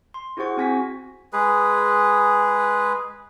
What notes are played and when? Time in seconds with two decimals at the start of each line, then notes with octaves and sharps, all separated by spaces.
0.14 C6
0.37 E4 F#4 G#4 C5 F#5 C#6
0.57 C4 F#4 G#5 A#6 B6
1.33 G#3 G#4 B4